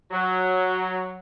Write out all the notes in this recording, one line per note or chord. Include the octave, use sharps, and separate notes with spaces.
F#3